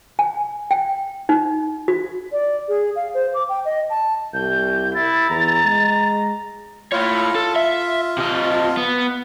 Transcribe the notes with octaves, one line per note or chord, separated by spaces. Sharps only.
G#5
G5
D#4
F#4
D5
G#4
F5
C5
D6
G5
D#5
A5
C2 G6
E4 A6
E2 A#5
G#3
E4 F4 C#5
A4
E5
C3 D#5
B3